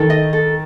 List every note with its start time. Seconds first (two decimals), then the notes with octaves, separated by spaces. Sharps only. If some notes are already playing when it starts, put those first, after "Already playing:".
Already playing: D#3 A4
0.10 D#5
0.33 A4